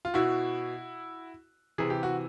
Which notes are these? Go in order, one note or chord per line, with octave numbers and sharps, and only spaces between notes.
F4
B2 E4 F#4
C3 E3 G#4
G4
F#4